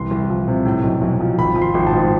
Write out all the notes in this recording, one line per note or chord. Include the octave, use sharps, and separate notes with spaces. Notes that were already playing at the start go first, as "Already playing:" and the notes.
Already playing: C2 E3 C6
C2
F3
C3
A2
B1
B1
F3
G#1 B5
F3
C6
G#1
A5
G#2